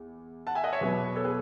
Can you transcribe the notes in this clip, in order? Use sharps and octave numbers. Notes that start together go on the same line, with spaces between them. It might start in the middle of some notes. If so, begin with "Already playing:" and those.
Already playing: E2
F#5 A5
E5 G#5
D#5 F#5
C#5 E5
E2 B2 F#3 B3
A4 C#5
G#4 B4